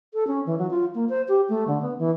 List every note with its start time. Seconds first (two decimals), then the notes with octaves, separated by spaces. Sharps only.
0.14 A4
0.27 C#4
0.46 E3
0.59 F#3
0.71 F4
0.95 A#3
1.09 C5
1.28 G4
1.49 A3
1.68 D3
1.82 B3
1.99 E3